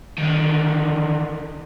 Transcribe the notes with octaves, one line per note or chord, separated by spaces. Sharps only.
D3 D#3